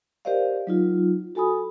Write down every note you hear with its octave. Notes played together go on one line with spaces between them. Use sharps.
G4 A#4 C5 D5 D#5 F5
F#3 D#4 F4
F#4 A4 G#5 B5 D#6